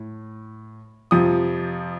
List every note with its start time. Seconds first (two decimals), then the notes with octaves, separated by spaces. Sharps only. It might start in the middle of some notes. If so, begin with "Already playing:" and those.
Already playing: A2
1.11 F2 C3 F3 D#6